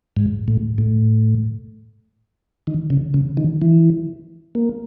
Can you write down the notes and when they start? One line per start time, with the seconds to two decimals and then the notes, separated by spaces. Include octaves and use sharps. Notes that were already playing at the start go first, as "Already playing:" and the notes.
0.17 G#2
0.48 A2
0.78 A2
2.67 D#3
2.90 C#3
3.14 C#3
3.37 D#3
3.62 E3
4.55 A#3